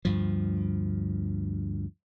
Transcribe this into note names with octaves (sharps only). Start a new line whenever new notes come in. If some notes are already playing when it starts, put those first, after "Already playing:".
D2 G2 F3